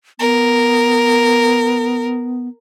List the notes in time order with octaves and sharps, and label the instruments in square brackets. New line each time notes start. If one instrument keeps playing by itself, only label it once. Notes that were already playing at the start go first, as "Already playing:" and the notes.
[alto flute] B3 [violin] A#4